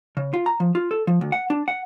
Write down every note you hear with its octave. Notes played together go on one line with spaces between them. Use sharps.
C#3
F4
A#5
F3
F4
A4
F3
D2
F#5
D4
F#5